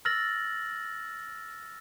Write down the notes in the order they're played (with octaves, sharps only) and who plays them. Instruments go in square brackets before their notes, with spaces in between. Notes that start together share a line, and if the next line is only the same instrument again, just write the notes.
[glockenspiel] E6 F6 A6 A#6 F#7